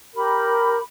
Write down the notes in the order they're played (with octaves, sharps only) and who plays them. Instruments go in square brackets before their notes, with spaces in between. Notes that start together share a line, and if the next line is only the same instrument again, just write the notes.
[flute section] G4 A#4 B5